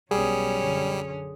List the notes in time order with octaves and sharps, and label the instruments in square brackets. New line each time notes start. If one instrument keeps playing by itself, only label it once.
[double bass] B1 B3 [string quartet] F#3 C#4 [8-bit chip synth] G3 [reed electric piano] G#4 D#6
[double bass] F#2 D3